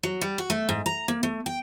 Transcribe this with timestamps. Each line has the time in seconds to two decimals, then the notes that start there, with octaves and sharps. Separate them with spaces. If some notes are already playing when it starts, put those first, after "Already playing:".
0.03 F#3
0.21 G3
0.38 F#4
0.50 A3
0.69 G#2
0.86 A#5
1.08 A#3
1.23 A3
1.46 G5